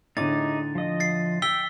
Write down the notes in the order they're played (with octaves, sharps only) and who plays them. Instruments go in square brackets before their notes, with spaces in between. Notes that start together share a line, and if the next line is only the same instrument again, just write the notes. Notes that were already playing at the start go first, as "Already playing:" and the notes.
[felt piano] A2 D3 [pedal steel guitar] D#4 G#4 D6 [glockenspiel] A6
[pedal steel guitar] F3 D#5
[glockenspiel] A6 C7
[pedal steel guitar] G5 [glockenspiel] E6 B6 G7